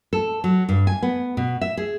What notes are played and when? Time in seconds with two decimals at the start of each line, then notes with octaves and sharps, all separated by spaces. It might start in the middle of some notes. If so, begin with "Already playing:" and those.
0.13 A4
0.44 F#3
0.69 G2
0.87 G#5
1.02 B3
1.37 B2
1.61 E5
1.77 G#4